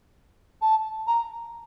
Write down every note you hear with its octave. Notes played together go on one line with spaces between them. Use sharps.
A5
A#5